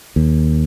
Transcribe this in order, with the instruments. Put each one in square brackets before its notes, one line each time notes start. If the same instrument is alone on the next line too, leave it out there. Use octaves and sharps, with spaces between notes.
[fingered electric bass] D#2